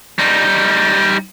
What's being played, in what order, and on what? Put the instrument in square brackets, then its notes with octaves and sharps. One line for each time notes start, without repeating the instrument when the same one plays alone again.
[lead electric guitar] G3 D#4